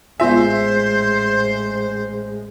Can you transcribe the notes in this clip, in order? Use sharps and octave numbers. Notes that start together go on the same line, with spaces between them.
A1 G#3 B3 F4 C5 E5 G#5